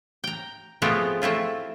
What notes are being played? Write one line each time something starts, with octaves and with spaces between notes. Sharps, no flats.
G5 A#5
F3 G#3 A3 B3 C4 G4
A3 C4 E4 F4